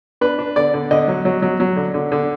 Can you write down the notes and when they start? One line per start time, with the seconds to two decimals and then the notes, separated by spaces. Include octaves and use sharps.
0.21 D4 B4
0.39 D4
0.56 D3 D5
0.74 D3
0.91 D3 D#5
1.08 F#3
1.25 F#3
1.42 F#3
1.60 F#3
1.77 D3
1.94 D3
2.12 D3